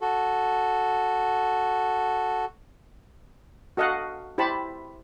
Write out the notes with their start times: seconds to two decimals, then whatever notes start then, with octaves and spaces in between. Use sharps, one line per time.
0.01 F#4 A4
3.77 F#4 A4 D#5 F5 F#5
4.38 E4 G4 C5 A5 B5